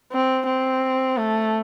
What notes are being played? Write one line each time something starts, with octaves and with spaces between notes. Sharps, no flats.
C4
C4
A3